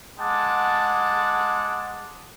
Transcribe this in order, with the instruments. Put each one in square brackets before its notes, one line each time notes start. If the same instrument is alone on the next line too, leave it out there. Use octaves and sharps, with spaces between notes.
[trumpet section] G#3 F#5 A5 D6